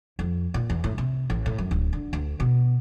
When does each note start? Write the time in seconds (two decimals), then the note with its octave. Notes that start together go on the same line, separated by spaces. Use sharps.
0.19 F2
0.54 A#2
0.70 E2
0.84 A2
0.98 C3
1.30 A1
1.46 A2
1.58 F#2
1.71 D1
1.93 D3
2.13 D2
2.40 B2